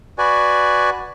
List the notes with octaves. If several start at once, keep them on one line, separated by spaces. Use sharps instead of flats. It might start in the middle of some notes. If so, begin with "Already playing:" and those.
F#4 B4 D5 G#5